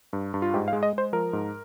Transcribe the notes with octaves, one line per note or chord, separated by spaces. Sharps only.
G2
G2
F4
G#2 G4
F5
G#3
D#5
G#3 C5
F3 A#4
G#2